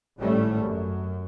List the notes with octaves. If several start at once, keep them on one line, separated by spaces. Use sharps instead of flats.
G#1 A2 G3 A3 C#4
F#2